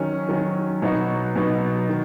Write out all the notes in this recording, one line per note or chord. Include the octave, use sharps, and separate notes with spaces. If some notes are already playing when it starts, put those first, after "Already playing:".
Already playing: D#3 F#3 C#4
D#3 F#3 C#4
B2 F#3 B3 D#4 F#4
B2 F#3 B3 D#4 F#4
D#3